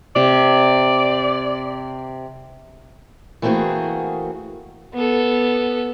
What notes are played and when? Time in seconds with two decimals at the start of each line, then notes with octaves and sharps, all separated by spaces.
0.16 C3 D5
3.42 E3 A3 A#3 C4 F#4 G#4
4.94 B3 A4